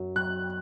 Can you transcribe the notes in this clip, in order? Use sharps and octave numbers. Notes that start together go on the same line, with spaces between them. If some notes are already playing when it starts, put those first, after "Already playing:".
Already playing: F#2 F#3
F#3 F#6